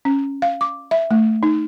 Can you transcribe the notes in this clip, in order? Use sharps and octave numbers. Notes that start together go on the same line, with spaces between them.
C#4
F5
D6
E5
A3
D#4